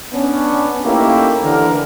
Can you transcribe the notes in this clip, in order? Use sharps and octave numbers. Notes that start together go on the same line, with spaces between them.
B3 C#4 D4
A3 A#3 C#4 D#4 E4 G4
D3 E3 A#4